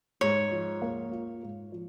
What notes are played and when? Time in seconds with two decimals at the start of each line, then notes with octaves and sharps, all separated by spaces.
0.21 G#2 C#5
0.51 F3
0.82 A#3
1.12 F4
1.43 G#2
1.72 F3